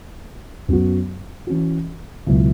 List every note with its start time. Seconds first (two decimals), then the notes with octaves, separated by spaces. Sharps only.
0.68 F#2 F#3 B3 F#4
1.47 E3 C#4 F#4
2.26 C#2 B2 F#3 E4